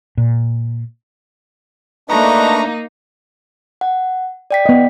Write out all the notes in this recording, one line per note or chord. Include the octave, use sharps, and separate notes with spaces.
A#2
A3 A#3 D4 D#4 B4 D#5 A#5 C#6
F#5
D5 G5 B6
B3 D#5